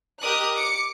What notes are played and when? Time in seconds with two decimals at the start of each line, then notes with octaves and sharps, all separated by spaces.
0.21 G4 A#4 D#5 D6 D#6 F#6
0.53 D6 C#7